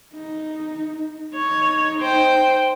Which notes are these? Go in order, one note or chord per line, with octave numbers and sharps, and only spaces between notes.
D#4
D#4 C#5 D#5
C5 G5